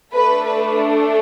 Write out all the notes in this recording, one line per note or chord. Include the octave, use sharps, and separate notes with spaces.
A3 D4 A4 B4
B4
A4